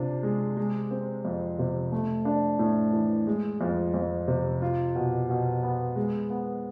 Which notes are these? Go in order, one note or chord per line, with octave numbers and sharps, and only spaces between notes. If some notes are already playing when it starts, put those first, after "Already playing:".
Already playing: C3 D4 F4
G#3
G#3
C4
F2
C3
A3
D4
A2
E3
G#3
F2
F2
C3
F4
B2
B2
B3
G#3
B3